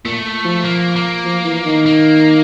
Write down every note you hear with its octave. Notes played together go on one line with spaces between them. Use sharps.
A#2 A3
F3
A#3
A#3
F3
E3
D#3
A#3